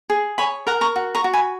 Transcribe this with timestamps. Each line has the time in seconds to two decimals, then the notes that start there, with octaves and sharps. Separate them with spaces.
0.10 G#4
0.38 C#5 G#5 B5
0.67 A#4 F#5 A#5
0.81 A#5 C#6
0.96 F#4
1.15 A#5 C#6
1.24 F#4
1.34 G#5 B5